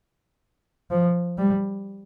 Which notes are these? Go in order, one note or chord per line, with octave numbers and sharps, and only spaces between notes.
F3
G3